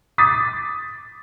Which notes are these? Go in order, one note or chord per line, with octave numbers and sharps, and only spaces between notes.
D6 D#6 A6 B6